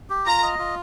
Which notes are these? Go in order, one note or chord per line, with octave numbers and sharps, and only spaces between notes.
G4
F4 A#5
D#5
F4